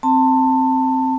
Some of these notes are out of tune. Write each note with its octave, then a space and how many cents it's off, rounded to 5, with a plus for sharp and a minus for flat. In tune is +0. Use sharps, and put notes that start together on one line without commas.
C4 +0 A5 +20